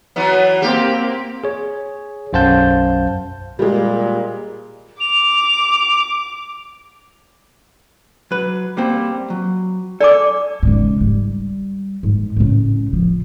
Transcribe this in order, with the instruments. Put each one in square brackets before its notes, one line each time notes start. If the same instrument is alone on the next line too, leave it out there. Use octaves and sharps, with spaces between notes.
[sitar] E3 F#3 B3
[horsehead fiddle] A#3 C4 [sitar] G4
[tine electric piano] G#4 C#5
B1 F#2 C5 F5 A5 G6
[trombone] A#2 [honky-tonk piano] G3 G#3
[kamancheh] D6 [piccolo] F7
[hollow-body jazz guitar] F#3 B4
G3 A#3 C4
F#3
[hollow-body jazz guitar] A4 G#5 [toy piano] D5 D6
[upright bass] G#2 C#3
G3
G#2
A2 C#3
F3